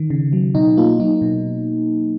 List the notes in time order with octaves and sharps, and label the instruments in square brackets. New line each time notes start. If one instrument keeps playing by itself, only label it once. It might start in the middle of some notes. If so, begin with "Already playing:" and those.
Already playing: [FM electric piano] D#3
C#3
F#3
B2 D#4
A#3 F4
F#3 D#4
B2